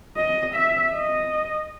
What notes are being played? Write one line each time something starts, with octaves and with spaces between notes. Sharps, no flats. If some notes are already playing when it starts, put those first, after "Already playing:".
D#5
E5
D#5